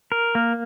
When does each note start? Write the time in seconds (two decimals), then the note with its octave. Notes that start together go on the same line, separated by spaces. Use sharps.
0.12 A#4
0.35 A#3